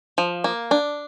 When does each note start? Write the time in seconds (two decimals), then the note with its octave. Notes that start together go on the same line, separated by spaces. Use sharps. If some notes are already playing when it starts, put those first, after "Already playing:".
0.18 F3
0.44 A#3
0.71 D4